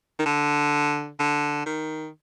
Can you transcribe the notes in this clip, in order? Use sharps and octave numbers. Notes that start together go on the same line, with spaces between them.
D#3
D3
D3
D#3